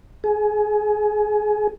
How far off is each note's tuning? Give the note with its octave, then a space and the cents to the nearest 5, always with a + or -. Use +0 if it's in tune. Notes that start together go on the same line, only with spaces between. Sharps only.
G#4 +25